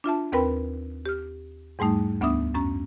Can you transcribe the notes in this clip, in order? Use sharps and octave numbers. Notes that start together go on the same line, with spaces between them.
D4 F4 E5 A5
D#2 C4 A#4 B4 G5 B5
G4 F6
E2 G#2 G3 A3 D#4
D2 B3 D4 E5 D#6
F#2 C#4 A#5